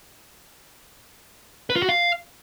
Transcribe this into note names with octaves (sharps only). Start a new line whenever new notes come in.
B4
F4
F#4
F5